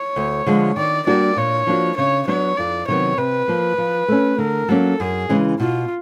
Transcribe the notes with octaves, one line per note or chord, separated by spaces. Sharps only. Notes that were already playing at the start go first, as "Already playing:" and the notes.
Already playing: C#5
D2
D3 F3 G#3
D#3 D5
G3 A#3 D4 F#4 D5
A#2 C#5
F3 A#3 D4 F#4
C#3 C#5
F#3 B3 D4 C#5
F2 D5
C3 D#3 F#3 B3 C#5
C3 B4
F3 A#3
F3
A3 C#4
D3 A#4
F#3 A#3 C#4 A4
F#2 G#4
C#3 E3 G#3 C#4
B2 F4